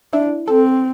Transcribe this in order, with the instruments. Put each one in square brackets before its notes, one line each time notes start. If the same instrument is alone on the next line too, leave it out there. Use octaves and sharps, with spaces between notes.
[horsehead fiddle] D4 [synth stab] E4
[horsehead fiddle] C4 [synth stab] A4